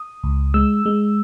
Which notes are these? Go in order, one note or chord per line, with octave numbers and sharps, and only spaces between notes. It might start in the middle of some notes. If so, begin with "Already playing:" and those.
Already playing: D#6
C#2
G#3 E6
G#3